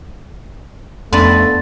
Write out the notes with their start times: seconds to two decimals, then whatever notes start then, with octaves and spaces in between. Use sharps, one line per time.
1.13 F2 A3 B3 D4 B5 C6 A6